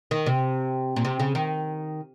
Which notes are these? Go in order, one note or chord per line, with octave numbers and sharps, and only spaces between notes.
D#3
C3
A#2
C3
C#3
D#3